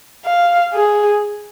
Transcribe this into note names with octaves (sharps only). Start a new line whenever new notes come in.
F5
G#4